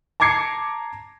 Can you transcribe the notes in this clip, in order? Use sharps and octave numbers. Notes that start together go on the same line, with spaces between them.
A5 A#5 D6 G#6 C7 C#7